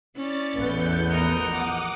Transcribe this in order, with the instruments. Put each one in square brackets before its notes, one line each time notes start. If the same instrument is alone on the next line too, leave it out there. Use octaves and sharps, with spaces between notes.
[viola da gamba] C#4 E4 D5 [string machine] A6
[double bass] A1 B3 [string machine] E2 G6 C#7
[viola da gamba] F3 A#4 D#5
[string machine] F#5 D6 D#6